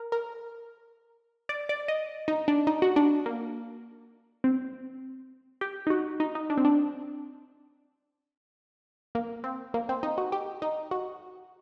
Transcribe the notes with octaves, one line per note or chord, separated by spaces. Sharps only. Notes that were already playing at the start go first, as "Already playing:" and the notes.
Already playing: A#4
A#4
D5
D5
D#5
D#4
D4
D#4
F#4
D4
A#3
C4
G4
D#4
F#4
D#4
D#4
D4
C4
D4
A#3
C4
A#3
C4
D#4
F#4
G4
D#4
F#4